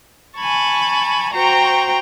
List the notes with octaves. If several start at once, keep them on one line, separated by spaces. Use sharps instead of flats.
G#5 A5 B5 C#6
F#4 C5 G5 A#5 C#6